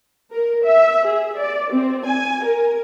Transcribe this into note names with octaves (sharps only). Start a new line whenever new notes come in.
A#4
E5
G#4
D5
C4
G#5
A#4